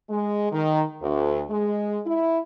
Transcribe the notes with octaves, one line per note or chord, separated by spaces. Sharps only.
G#3
D#3
D2
G#3
E4